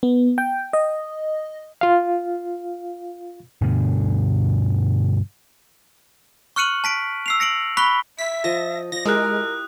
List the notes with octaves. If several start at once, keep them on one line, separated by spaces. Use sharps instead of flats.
B3
G5
D#5
F4 F5
G2 B2 D3
C#6 F6 F#6 C#7 D#7 F#7
A5 B6 D7
E6 C7 F7
A#6 C#7 D7 F#7
B5 C#6 F#6 B6 G7
E5 B6
F3 D#5 A5 A#6
F3 D5 A#6
G#3 E4 G4 A#4 D#6 F#6